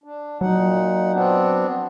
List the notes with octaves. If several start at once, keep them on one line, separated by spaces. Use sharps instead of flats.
D4
A#2 F#3 D#4 F#5
B3 C4 D4